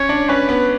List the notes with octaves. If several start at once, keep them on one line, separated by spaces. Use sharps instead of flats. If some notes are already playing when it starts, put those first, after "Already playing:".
Already playing: C#4 C#5
D4
C#4 B4
B3